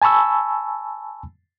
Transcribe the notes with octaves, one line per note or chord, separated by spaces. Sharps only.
G#5 A5 B5 C#6 E6